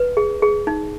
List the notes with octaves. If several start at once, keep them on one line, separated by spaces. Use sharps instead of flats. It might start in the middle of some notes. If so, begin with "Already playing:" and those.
Already playing: B4
G#4
G#4
D#4